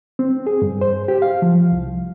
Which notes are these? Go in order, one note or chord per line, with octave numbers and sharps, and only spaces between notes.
C4
G#4
G2
C5
G4
F5
F3
C2